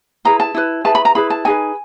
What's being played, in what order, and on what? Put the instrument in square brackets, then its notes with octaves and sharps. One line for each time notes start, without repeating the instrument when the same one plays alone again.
[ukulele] E4 G#4 B4 A#5
A5
E4 G#4 B4
E4 G#4 B4 A5
B5
A#5
E4 G#4 B4 B5
A5
D#4 G#4 B4 G#5